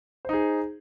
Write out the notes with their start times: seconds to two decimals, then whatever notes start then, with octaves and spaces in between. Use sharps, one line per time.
0.25 C5
0.29 D#4
0.33 G#4